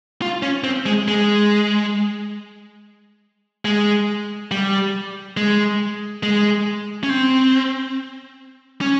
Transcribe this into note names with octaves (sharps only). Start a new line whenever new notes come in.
F4
C#4
C4
G#3
G#3
G#3
G3
G#3
G#3
C#4
C4
C#4